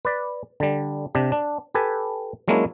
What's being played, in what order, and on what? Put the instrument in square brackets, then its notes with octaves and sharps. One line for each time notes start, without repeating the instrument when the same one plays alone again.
[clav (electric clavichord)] B4 D5
D3 G3
C3 D4 G4
D4
G4 A4 B4 G#5
F#3 G#3 A#3 C#4 D4 E4